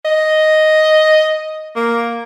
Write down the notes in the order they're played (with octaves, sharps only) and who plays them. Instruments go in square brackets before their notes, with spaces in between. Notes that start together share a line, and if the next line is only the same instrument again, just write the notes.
[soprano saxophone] D#5
A#3